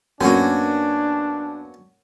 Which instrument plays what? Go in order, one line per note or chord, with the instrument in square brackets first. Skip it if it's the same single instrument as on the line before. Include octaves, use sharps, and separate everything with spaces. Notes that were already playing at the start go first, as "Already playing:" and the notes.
[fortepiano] F#2 [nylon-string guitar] A#3 B3 [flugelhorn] D4 [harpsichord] F#4 F#5 G#5